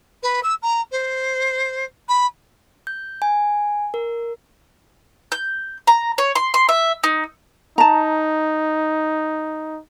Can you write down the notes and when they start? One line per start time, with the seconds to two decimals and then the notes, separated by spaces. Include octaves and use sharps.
0.23 B4
0.43 E6
0.62 A#5
0.92 C5
2.08 B5
2.87 G6
3.22 G#5
3.94 A#4
5.32 G6
5.87 A#5
6.18 C#5
6.35 C6
6.54 C6
6.69 E5
7.04 D#4
7.78 D#4 A5 A#5